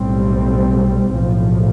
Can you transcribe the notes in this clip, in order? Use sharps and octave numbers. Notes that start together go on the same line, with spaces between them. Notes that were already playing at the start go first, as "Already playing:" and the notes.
Already playing: B1 A2 G3 C4
B1 A2 F3